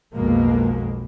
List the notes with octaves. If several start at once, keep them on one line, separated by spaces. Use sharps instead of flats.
B1 F2 B2 G#3 A#3